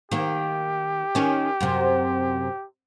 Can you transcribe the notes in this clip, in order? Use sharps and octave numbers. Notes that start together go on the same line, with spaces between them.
D#3 A#3 G4
D#3 C#4
F#2 C3